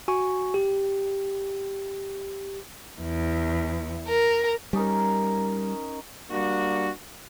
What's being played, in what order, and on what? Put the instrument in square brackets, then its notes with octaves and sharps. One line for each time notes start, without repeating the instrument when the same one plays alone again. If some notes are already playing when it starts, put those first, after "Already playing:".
[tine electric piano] F#4 G#5 C#6
G4
[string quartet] E2
A#4
[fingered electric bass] G3 [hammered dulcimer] C#4 D#4 A#4
[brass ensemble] G3 A#3 D4 F#4